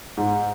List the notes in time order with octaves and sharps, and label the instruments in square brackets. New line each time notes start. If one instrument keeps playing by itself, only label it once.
[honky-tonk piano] G#2